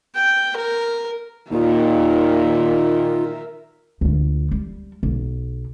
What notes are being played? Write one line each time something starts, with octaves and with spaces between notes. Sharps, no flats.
G5
A#4
D#2 A#2 D#3 D#4 F4 A#4 E5
D2 F4
G3
B1